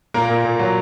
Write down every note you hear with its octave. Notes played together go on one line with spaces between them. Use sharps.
A#2 A#3 A#4
A#2
A#2
F#3